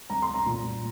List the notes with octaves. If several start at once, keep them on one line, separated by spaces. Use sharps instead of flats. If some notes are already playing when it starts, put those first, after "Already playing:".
C2 A#5
C6
C2
A#5
A#2
A#2